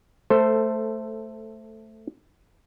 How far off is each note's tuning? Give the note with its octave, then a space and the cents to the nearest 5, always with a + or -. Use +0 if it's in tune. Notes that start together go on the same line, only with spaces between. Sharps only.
A3 +0 A4 +15 C5 +0